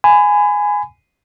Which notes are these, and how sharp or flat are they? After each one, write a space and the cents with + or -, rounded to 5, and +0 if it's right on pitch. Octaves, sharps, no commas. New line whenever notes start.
G#5 +0 B5 +30